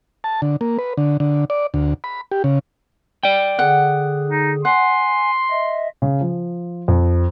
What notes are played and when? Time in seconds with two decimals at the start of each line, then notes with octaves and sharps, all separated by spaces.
0.24 A5
0.42 D3
0.61 A#3
0.79 B4
0.97 D3
1.20 D3
1.50 D5
1.74 D2
2.04 B5
2.32 G4
2.44 C#3
3.23 D5 G5
3.59 D3 G#4 F#5
4.29 D#4
4.65 F#5 G#5 C6
5.50 D#5 E5
6.02 C#3
6.21 F3
6.88 F2